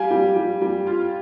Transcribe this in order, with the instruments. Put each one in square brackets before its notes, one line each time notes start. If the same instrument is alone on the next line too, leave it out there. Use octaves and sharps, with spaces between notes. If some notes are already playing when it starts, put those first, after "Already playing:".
Already playing: [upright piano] G3 [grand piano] F5 G#5
[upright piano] G3
G3
G3
F4